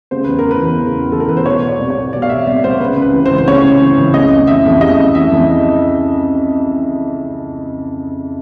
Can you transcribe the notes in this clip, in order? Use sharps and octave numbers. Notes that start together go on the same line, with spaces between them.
C#3 C5
E2 B4
A#4
E3 B4
E2
C#3
E2
E3 A4
A#4
E2 B4
C5
B2 C#5
B2
D5
C2
C#5
C2
B2 D5
F5
B2 E5
C2 D5
C2 C5
C#3 B4
C#2 B4
E3
C5
C#2
C5
C#3 C#5
C#2
E3
C#2
C#3 D#5
F2
E3 E5
F2
C#3 D#5
F2
E3 E5
F2